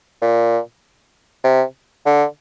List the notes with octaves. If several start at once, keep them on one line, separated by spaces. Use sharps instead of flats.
A#2
C3
D3